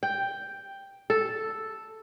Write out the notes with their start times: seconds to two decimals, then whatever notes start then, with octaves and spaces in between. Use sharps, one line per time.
0.03 G5
1.10 A4